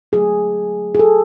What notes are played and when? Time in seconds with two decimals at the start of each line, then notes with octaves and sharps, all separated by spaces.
0.12 D3 F#3 A3 G#4
0.95 G#4
0.99 A4